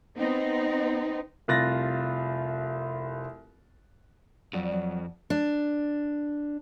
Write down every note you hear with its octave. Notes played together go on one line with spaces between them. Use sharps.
B3 C4 D#4
F1 C2 F4 F#6 A6 A#6
F2 F#3 D5
F#3
D4